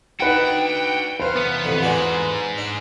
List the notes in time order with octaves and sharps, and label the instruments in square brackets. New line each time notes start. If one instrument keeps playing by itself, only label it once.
[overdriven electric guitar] D4 F#4 [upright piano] D#4 B4 F#5 [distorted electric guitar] G5
[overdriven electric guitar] E2 F5 [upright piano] B4 C5
[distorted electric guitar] B3
[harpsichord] A1 F2 D3
[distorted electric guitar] G#2 G#3 [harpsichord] B3 F#4 D5
[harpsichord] D4